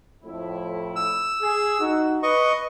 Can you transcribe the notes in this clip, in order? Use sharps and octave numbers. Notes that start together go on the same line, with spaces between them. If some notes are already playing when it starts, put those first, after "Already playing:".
F2 A2 E4
E6
G#4
D#4 F#4
B4 D#5 C#6